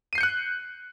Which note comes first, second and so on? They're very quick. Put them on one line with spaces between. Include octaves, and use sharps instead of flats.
D#7 C7 G6 C#7 F#6